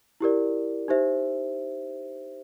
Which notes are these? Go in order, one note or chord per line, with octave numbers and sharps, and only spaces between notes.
E4 G4 A#4 D5
D#4 G4 C5 E5